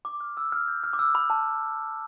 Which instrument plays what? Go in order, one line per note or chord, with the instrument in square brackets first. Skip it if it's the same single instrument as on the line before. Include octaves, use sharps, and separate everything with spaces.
[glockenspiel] D6
F6
E6
F6
G6
F6
D6
E6
B5
A5